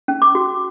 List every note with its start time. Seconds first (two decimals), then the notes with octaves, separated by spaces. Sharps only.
0.08 C#4
0.22 D6
0.35 F#4